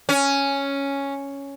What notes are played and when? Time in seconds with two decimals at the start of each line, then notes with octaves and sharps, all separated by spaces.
0.09 C#4